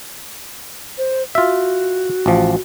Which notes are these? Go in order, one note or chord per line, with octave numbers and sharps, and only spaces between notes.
C5
F4 F#4 E5
A1 F3